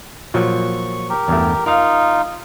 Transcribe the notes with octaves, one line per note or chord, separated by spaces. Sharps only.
A#2 F3 F#3 C#6
G4 A#4
E2 G2 A3
D#4 F4 A#4 F5